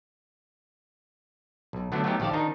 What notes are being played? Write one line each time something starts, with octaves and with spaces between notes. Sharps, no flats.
B1
D3 F#3 A3 B3 D4
F#3 A3 B3 D#4 G4
A#1 D#3 G4 D5 F5 A5
D#3 D4 D#4